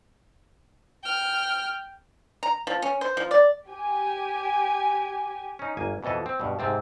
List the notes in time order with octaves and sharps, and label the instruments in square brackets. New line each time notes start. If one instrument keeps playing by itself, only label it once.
[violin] G5 F6
[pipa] A#5
F3
C#4
C5
F3
D5
[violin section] G4 G#5
[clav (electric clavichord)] C#4 D#4
G1 A#3 G#5
F2 B2 E3 A4 D#5
C4
G2 B2
G#2 C3 C4 A5